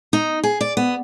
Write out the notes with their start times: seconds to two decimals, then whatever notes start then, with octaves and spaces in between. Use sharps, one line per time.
0.13 D#4
0.44 G#4
0.61 D5
0.77 B3